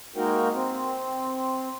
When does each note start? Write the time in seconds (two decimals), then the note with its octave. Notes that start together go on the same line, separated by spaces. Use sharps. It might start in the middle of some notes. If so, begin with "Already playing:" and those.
0.16 G#3 A#3 D#4 F#4 A#4 G5
0.53 C4